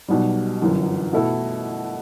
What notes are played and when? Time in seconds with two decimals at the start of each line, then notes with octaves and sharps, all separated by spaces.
0.08 B1 B2 G3
0.61 G1 F#2 E3
1.13 B2 A3 E4 A4